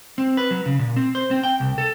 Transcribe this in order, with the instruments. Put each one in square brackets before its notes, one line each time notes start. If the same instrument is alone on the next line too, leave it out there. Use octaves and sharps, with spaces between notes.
[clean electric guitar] C4
B4
F#3
C#3
A#2
C4
C5
C4
G5
C2
A4